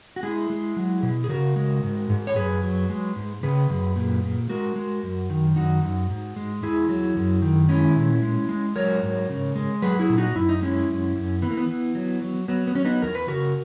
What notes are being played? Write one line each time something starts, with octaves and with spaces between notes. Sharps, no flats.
F#4
G#3 E4 G#4
G#3
F#3
B2
G#4
C#3 F#4 A#4
G#3
G#2
G#2
C#5
F#2 G#4 B4
F#3
G#3
G#2
C#3 G#4 B4
F#2
A#2
A#2
G#3 F#4 A#4
G#3
F#2
D#3
F#2 D#4 F#4
F#2
G#2
G#3
E2 E4 G#4
F#3
F#2
D#3
G#3 C#4 E4
A#2
G#3
G#3
F#3 A#4 C#5
G#2
C#3
G#3
F#3 G#4 B4
E4 G#4
A#2
D#4 F#4
F#2 E4
D#4
G#3 C#4 E4
F#2
F#2
E3 B3
A#3
B3
E3
F#3
F#3
F#3 B3
B3
F#3 C#4
B3 D#4
E2 A#4
B4
C#3 F#4 A#4